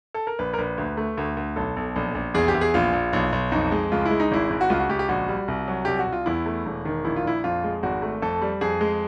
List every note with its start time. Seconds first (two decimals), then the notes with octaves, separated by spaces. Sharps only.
0.14 A4
0.27 A#4
0.39 A#1 B4
0.54 A#4
0.58 A#1 B4
0.78 D2
0.97 A3
1.17 D2
1.37 D2
1.56 B1 A4
1.76 B1
1.96 A#1
2.15 A#1
2.34 E2 G#4
2.48 G4
2.54 E2
2.61 G#4
2.74 A#1 F4
2.93 A#1
3.13 B1
3.32 B1
3.52 F2 D#4
3.72 G#3
3.92 C#2 F4
4.05 E4
4.11 G#3
4.20 D#4
4.31 G#1 E4
4.50 G#1
4.61 F#4
4.70 C#2 F4
4.79 F#4
4.89 C#2 G4
4.99 G4
5.09 A#1 F#4
5.29 G3
5.48 C2
5.68 F#3
5.85 C2 G4
5.99 F#4
6.07 C2
6.12 F4
6.26 E2 E4
6.46 A3
6.66 E1
6.85 D#3
7.05 A#1 E4
7.16 F4
7.24 A#1 E4
7.44 F2 F4
7.64 G#3
7.83 G#1 F#4
8.02 A3
8.22 F2 A4
8.42 G3
8.61 F2 G#4
8.81 G#3